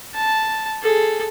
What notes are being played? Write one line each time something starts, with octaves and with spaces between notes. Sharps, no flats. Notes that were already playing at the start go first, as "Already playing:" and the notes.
A5
G#4 A4